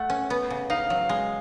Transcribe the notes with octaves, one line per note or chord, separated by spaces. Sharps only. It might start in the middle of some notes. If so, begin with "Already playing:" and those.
Already playing: A3 F#5
C#4
B3
C#3
D#4 F5
F#3
G#3